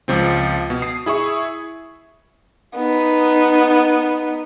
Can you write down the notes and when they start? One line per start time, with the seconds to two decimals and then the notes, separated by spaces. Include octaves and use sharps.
0.08 C#2 F3 C4
0.70 B2
0.82 D#6 C7
1.06 E4 G#4 E5 C#6
2.76 B3 D#4